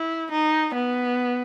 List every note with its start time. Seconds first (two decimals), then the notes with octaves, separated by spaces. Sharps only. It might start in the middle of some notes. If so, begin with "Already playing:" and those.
Already playing: E4
0.32 D#4
0.75 B3